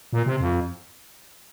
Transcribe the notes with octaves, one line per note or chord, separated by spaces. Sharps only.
A#2
C3
F2